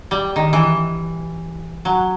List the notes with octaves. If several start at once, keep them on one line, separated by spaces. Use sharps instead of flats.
G3
D#3
E3
F#3